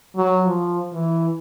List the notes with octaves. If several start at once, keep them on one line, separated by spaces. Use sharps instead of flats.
F#3
F3
E3